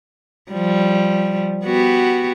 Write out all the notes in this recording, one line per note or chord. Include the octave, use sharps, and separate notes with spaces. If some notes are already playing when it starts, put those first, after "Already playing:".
F3 G3
B3 F#4 G4